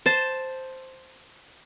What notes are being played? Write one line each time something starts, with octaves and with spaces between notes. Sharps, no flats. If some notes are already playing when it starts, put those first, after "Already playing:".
C5 A5